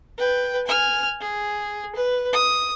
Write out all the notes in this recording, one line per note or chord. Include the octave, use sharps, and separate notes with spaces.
B4 G5
G#5 F6
G#4
B4
D#6